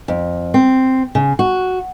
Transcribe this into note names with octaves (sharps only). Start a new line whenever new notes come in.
F2
C4
C#3
F#4